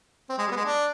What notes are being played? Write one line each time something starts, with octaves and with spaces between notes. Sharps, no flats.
C4
G#3
G3
B3
G#3
D4